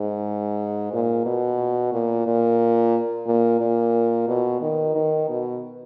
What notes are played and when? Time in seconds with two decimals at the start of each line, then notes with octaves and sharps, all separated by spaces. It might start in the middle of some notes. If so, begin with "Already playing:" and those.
Already playing: G#2
0.93 A#2
1.25 B2
1.93 A#2
2.26 A#2
3.27 A#2
3.60 A#2
4.28 B2
4.61 D#3
4.95 D#3
5.29 B2